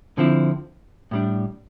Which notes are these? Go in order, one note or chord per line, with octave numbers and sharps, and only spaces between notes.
D3 F3 C4 E4
A2 G3 D4